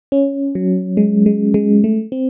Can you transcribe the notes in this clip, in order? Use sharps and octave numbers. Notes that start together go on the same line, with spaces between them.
C#4
F#3
G#3
G#3
G#3
A3
C4